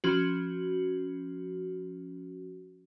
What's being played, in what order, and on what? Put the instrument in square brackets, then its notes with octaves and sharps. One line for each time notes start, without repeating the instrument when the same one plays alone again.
[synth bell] F3 C#4 F#4